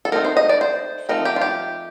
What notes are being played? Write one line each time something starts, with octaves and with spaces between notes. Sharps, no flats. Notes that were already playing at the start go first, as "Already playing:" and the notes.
A4
A3 C4 D#4 A#4
C5
D#5
D5
C5
F3 A3 C4 D#4 A#4
G4
F4
G4